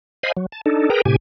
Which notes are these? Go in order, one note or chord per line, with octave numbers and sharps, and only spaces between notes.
C5 D#5 F5 G#5 B5
F#3
A5
D4 D#4 A4
G#4 A#4 B4 G5 A#5
A2 C3 G4 G#5